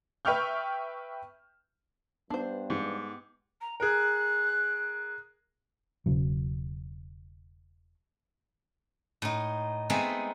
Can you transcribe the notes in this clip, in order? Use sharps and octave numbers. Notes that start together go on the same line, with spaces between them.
B4 E5 G5 C#6 F6 G6
G2 B3 D4 C5
G#2 G4
A#5
G#4 A#4 F#6
E1 C#3 F#3
A2 D#4
G#3 A3 B3 C4 D#4 G#4